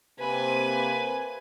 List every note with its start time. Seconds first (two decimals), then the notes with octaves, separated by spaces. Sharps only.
0.19 C3 A#3 C4 B4 G#5